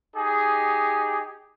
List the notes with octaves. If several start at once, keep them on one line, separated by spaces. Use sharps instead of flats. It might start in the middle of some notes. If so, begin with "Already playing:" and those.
D#4 G4 G#4